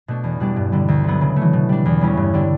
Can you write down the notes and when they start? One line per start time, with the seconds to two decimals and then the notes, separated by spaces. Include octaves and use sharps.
0.08 B2 A3 D4
0.24 E2
0.40 B2 G3 D4
0.56 G2
0.72 D3 G3
0.88 D2
1.04 D3 F#3 B3
1.21 C#3
1.36 A3
1.42 E3
1.53 B2
1.69 G3 D4
1.86 E2
2.01 C#3 G3 C#4 E4
2.17 G2
2.34 D3 G3 D4